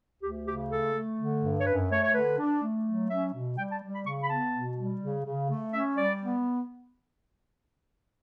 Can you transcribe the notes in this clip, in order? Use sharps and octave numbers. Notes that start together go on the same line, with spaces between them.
D2 G4
C#3 G4
A3 A4
A3
D3
G2
C#5
F#2 B4
A3 C#5
C#5
D3 B4
D4
A3
F#3
C#4 E5
B2
G3 G5
A5
G3
B5
C#3 C#6
B5
B3 A5
B2
G3
C#3
C#3
A3
C#4 E5
G3 D5
B3